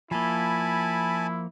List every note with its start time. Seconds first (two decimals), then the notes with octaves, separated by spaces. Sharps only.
0.11 F3 A#3 E4 G#5 A5 B5